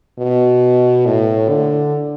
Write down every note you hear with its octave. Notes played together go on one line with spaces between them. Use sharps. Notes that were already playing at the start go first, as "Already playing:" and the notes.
B2
A2
D3